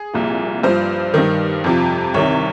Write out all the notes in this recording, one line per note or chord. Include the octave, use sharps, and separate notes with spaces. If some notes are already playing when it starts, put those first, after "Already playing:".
Already playing: G#4
C2 A#2 F3
G2 F3 C5
G2 D#3
F2 C3 F3
C2 C3 D#3 C#5